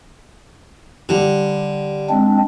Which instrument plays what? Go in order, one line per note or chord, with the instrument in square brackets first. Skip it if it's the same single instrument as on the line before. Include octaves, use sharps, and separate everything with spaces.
[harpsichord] D3 [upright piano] G3
[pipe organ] G#3 C4 D4